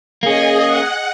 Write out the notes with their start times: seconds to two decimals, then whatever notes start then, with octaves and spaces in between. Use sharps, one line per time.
0.23 A#3 C#4 G#4 D#5
0.67 F#5